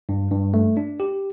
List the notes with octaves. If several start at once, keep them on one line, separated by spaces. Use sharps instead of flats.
G2
G2
A3
D4
G4